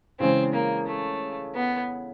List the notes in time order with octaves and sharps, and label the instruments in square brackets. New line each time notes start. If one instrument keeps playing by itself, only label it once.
[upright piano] C#3 E3 G#3 C#4 [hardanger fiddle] C4
[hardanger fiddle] A#3
A3
B3